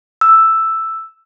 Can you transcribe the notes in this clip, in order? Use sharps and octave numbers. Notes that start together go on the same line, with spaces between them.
E6